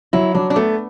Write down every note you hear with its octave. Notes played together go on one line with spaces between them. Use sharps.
F#3 E4
F#3 D4
D4
A3 B3